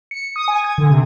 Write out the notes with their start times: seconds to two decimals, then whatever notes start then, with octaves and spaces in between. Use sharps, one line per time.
0.11 C#7
0.36 D#6
0.48 G#5
0.64 G#6
0.78 D3
0.90 C3